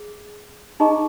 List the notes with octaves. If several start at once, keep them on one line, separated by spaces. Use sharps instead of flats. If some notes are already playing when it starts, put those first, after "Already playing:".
Already playing: G#4
D#4 G#4 D#5 A#5 C#6